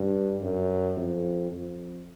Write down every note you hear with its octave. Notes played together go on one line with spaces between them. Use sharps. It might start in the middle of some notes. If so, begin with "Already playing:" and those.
Already playing: G2
F#2
F2
F2